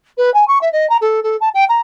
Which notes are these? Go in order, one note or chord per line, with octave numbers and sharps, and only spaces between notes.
B4
G#5
C#6
E5
D#5
A#5
A4
A4
A5
G5
A#5